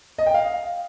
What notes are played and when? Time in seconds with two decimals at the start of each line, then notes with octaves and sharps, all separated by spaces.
0.18 D#5
0.26 G5
0.34 F5